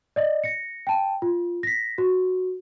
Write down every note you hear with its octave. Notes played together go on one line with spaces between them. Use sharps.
D5 D#5
A#6 C#7
G5 A5
F4
A#6 B6
F#4